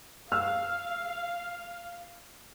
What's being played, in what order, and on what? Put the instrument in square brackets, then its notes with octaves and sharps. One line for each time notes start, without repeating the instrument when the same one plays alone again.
[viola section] F5 [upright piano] E6 F6